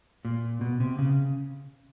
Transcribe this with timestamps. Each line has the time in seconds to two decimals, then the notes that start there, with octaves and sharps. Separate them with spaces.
0.25 A#2
0.61 B2
0.80 C3
0.98 C#3